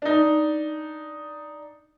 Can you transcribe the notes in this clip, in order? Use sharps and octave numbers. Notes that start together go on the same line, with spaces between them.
D4 D#4